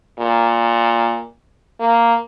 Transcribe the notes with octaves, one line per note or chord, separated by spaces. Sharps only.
A#2
A#3